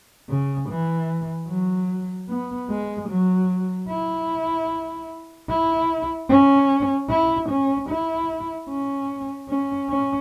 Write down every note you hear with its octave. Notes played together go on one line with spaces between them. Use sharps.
C#3
E3
F#3
B3
G#3
F#3
E4
E4
C#4
E4
C#4
E4
C#4
C#4
C#4